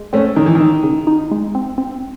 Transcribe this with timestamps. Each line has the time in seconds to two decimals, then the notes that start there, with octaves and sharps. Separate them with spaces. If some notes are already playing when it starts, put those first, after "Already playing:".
Already playing: G#3
0.13 A3 C4 C#4
0.36 D#3 D#4
0.46 E3
0.55 D#3
0.61 D#4
0.83 C#3
1.07 D#4
1.31 G#3
1.55 C4
1.78 C4